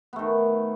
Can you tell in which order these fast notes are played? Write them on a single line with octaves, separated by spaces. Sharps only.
B3 A3 D#3